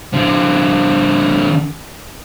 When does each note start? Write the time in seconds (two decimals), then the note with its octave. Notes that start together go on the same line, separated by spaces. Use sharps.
0.13 D3 C4